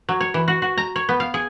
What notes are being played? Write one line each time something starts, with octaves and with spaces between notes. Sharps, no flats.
F#3
C#5
E3
F#4
F#4
A#5
C#5
B3
F5
G#4